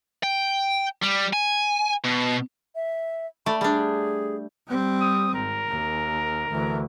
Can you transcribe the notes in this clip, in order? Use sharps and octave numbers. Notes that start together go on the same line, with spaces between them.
G5
G3
G#5
B2
E5
A3 D5 B5
G3 D4 G#4
G3 C4
D#6
G#1 A#4
D#2
D2 E3